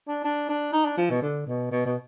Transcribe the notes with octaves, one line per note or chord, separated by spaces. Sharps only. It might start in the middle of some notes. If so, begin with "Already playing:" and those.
D4
D4
D4
D#4
D4
F3
B2
D3
B2
B2
B2